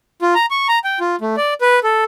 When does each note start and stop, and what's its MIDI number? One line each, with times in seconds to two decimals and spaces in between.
0.22 0.34 65
0.35 0.46 82
0.51 0.68 85
0.68 0.79 82
0.84 0.99 79
1.00 1.16 65
1.21 1.36 57
1.37 1.54 74
1.61 1.80 71
1.84 2.04 69